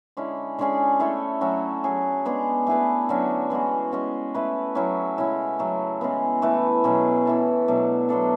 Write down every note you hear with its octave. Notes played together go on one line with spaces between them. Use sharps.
D3 G#3 C#4 E4
D3 G#3 C#4 G#4
A3 E4 A4 C#5
F#3 A3 C#4 F#4
F#3 C#4 G#4
G#3 B3 D4 G#4
A3 E4 G#4 B4
D3 F#3 C#4 F#4
E3 G#3 B3 F#4
G#3 C#4 F#4
A3 E4 B4
F#3 C#4 E4
C#3 G#3 C#4 E4
C#3 F#3 A3
C#3 E3 G#3 B3
E3 A3 E4 B4
B2 F#3 C#4 G#4
E3 A3 E4 A4
B2 F#3 A3 D4
F#3 B3 D4 A4